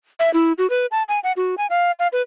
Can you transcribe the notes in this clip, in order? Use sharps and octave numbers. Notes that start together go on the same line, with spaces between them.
E5
E4
F#4
B4
A5
G#5
F#5
F#4
G#5
F5
F5
B4